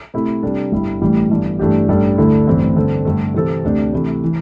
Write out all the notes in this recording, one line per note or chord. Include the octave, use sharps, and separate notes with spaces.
C3 A3 E4
C3 G3 D4 A4
G1 G2 G3 E4
A1 A2 E3 G3
G1 G2 E3 G3
G2 E3 A3 D4 G4
A1 G2 G3 D4 A4
D2 D3 A3 E4 A4
A1 G2 E3 C4 E4
G2 D3 C4 A4
G2 D3 A3
C3 E3 C4 A4
D2 C3 A3 D4 G4
C3 E3 A3 E4
E3